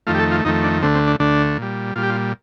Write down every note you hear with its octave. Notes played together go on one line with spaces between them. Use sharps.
F2 D#3 A3 F4
G4
A4
F4
F2 D#3 A3 D#4
D4
D2 D3 A3 C4
C4
D4
D2 D3 A3 D4
A#2 G3
A#2 G3 F4
G4
F4